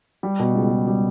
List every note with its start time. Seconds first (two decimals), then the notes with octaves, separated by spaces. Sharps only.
0.23 G3
0.39 B2
0.55 C#2
0.71 C#2
0.87 G3